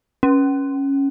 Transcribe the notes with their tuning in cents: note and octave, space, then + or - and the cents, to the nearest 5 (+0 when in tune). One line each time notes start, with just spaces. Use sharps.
C#4 -5